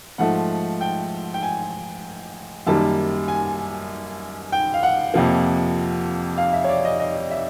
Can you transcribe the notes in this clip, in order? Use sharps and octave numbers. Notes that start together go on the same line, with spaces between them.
G#2 F3 A3 F#5
G5
G5
G#5
F#2 D#3 G3 A#3 A5
G#5
G5
F5
F#5
F2 C3 F3 A#3
F5
E5
C#5
D5
D#5
D#5
E5